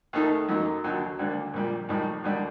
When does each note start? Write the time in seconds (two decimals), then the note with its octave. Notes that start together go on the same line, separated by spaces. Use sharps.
0.13 D#2 D#3 A3 D#4
0.49 F#2 F#3 A#3 D#4
0.84 D#2 D3 F#3
1.19 D2 D3 G3 A#3 D4
1.54 A#1 A#2 G3 A#3
1.89 A#1 A2 G3 A#3 D#4
2.24 D#2 D3 G3 D4